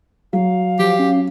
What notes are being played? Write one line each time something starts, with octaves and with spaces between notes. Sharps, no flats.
F#3 F5
F3 G4
C#4